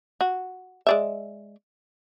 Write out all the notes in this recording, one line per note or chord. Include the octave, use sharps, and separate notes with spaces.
F#4
G#3 D5 E5